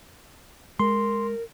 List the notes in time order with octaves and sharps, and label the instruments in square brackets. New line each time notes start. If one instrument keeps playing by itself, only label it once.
[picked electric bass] G#3 [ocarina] A#4 [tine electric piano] C6